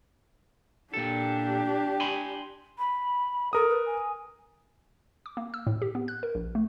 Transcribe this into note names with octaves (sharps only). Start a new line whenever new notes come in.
A#2 D4 G4 A4
G#5 B5 C6
B5
A4 A#4 D#6
B4
G#5
D6
A#3
E6
A2
G4
B3
F#6
A#4
A#1
A3